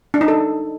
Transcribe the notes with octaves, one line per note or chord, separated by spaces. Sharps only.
D4
D#4
A4